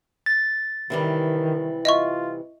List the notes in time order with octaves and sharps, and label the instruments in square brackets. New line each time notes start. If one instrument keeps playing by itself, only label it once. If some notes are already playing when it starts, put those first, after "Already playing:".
[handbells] A6
[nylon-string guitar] C3 E3 G3 [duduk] D#3
[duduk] F4 [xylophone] D#5 E5 C#6